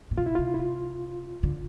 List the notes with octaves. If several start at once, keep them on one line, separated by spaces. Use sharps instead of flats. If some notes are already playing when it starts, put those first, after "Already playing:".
A#2
B2 F4
E4
C3 F4
E4
F4
D3